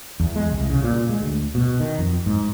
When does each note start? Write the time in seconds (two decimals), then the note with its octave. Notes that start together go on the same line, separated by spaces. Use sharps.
0.20 E2
0.36 G#3
0.52 C2
0.70 C#3
0.84 A#2
1.09 G#3
1.22 D2
1.55 B2
1.80 D#3
1.98 F2
2.26 G#2